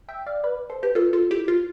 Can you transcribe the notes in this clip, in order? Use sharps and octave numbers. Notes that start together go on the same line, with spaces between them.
E5 G5
D5 F5
B4 D5
A4 C5
G4 B4
F4 A4
F4 A4
E4 G4
F4